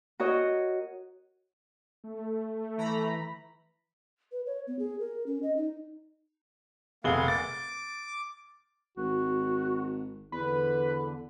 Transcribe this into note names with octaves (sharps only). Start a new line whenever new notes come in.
F#4 A#4 C#5 D#5
A3
E3 A#5 B5
B4
C#5
B3
G#4
A#4
C#4
D#5
D#4
F1 A#3 G#4 F5 F#5 G7
D6 A6
G#1 F#4
E2 D3 B4